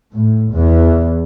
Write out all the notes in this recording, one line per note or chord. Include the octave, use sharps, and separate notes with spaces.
A2
E2